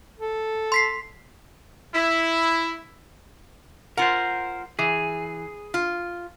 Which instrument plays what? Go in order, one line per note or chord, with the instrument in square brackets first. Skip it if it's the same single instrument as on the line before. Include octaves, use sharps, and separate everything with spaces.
[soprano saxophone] A4
[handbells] C6 B6 C7
[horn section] E4
[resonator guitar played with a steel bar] F4 F#5 [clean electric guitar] A#4 C5
[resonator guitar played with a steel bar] E3 [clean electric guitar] G#4
[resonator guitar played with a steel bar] F4